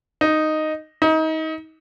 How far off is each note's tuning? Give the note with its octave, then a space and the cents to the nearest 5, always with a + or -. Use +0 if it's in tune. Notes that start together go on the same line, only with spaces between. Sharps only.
D#4 -5
D#4 +30